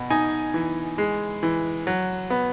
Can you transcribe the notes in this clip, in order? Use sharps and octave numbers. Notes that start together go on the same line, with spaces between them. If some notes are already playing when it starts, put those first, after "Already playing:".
Already playing: B2
D#4 G#5
E3
G#3
E3
F#3
B3